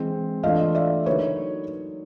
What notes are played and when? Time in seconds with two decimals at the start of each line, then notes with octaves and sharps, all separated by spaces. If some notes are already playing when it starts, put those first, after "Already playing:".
Already playing: E3 G#3 C4
0.43 E3 A3 D4 F4 D#5 F5
0.75 D5 E5
1.06 D3 F#3 A#3 D#4 B4 C#5